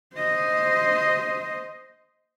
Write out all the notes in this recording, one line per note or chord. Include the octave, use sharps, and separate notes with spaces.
C5 D#5